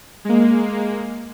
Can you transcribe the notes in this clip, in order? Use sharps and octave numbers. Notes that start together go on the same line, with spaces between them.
G#3 A#3